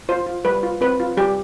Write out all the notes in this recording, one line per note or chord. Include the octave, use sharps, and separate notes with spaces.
F4 C5
F4
G3 B4
F4
C4 B4
F4
G3 G4